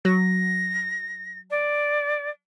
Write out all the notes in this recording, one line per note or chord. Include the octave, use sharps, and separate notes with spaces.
F#3 A#6
D5